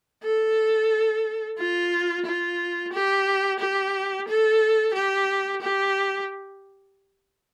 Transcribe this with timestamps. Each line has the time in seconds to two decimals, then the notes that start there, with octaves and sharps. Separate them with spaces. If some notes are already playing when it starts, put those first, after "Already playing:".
0.23 A4
1.58 F4
2.26 F4
2.93 G4
3.60 G4
4.28 A4
4.94 G4
5.61 G4